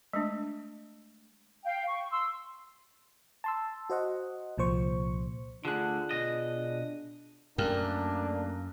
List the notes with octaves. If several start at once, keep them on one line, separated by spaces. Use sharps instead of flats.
G#3 A3 D4
F5 G5
C#6
C6 E6
A5 C6 E6
F#4 C5 D#5 F#5
C2 A#2 F3 C5 C#6
D2 D3 D4 F4 G#4 F#6
B2 D#5
F#2 A3 A#3 D4 A#4 G5 F6